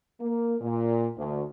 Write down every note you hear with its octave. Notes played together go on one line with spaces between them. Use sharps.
A#3
A#2
D2